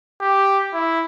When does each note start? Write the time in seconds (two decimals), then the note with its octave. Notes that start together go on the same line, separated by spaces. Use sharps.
0.21 G4
0.74 E4